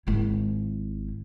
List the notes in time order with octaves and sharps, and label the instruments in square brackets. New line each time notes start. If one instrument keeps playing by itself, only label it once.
[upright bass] G#1 E4